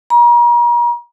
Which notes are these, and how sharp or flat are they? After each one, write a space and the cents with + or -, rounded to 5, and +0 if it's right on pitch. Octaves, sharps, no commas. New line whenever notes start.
A#5 +40